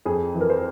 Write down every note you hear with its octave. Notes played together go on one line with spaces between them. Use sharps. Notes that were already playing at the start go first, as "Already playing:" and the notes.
F2 G#4
E3
A#4
C5